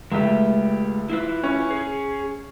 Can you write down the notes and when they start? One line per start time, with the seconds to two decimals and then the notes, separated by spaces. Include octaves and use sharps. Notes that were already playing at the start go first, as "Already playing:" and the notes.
0.12 C#2 G#3 A3 G4
1.10 E4 F4 B4
1.43 C#4
1.71 G#4